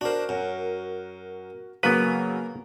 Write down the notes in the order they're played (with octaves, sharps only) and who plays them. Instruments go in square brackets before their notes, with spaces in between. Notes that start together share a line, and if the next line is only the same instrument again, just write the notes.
[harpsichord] D4 C5 [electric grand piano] F#4 A#4
[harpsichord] F#2
[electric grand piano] C#3 F#3 F#4 [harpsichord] A#3 [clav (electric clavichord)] B3 B4